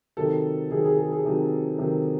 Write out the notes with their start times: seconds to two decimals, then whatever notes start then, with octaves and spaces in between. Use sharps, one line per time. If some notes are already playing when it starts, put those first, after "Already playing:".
0.17 C3 D#3 F#3 A4
0.71 C3 D#3 F#3 G#4
0.85 G#4
0.98 G#4
1.12 G#4
1.25 C3 D#3 F#3
1.78 C3 D#3 F#3